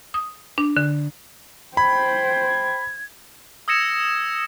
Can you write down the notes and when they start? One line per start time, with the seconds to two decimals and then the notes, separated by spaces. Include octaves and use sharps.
0.14 D#6
0.58 D4
0.77 D3
1.77 C5 G5 B5 G#6
3.68 D#6 E6 G#6 A#6 C#7 E7